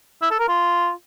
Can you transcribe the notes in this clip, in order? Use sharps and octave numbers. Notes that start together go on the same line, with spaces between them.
E4
A4
A#4
F4